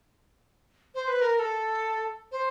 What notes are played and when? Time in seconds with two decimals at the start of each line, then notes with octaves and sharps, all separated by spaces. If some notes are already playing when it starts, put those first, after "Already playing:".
0.95 C5
1.08 B4
1.21 A#4
1.35 A#4
1.39 A4
2.32 C5